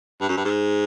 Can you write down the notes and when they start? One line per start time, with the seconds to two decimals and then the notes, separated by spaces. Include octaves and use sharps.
0.21 G2
0.29 F#2
0.37 G2
0.45 G#2